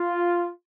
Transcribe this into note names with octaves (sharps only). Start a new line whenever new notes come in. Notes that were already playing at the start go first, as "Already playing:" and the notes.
Already playing: F4